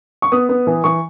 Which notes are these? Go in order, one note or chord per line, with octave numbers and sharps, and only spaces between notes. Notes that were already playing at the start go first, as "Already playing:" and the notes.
C#6
B3 D#6
B3
E3
E3 C#6